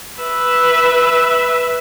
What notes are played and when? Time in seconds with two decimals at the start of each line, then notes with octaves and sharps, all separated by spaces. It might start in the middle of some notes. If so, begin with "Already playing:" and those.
0.20 B4 E5